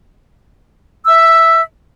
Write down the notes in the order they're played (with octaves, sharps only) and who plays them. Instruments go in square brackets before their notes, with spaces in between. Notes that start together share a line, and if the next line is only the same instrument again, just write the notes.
[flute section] E5 E6